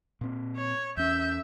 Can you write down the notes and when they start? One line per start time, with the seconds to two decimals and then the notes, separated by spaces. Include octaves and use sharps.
0.21 A#2 C4
0.56 C#5
0.97 E2 C#4 E5 G6